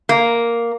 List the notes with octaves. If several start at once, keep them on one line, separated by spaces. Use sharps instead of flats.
A#3